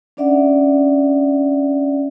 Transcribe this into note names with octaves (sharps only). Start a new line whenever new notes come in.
C#4 D4 D5 E5 F#5